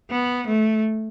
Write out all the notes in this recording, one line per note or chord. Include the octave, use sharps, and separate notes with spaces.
B3
A3